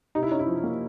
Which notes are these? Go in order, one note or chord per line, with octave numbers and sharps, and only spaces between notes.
C3 D#4
E4
C#4 D#4
E4
F3
A#3